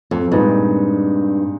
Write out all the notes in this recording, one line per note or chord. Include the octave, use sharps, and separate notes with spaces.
F2
G2 A#2 G#3 C4 D#4